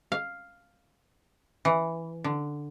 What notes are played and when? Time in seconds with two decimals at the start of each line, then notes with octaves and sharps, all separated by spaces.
0.12 F5
1.65 E3
2.24 D3